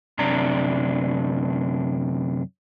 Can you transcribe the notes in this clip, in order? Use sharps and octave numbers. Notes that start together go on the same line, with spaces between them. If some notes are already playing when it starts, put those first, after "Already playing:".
F#2 C3 D4 A#5